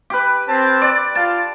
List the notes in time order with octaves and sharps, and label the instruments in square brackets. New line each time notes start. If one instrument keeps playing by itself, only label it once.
[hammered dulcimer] G4 B4
[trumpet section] C4 A5
[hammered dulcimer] D5
[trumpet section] F4 [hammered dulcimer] A5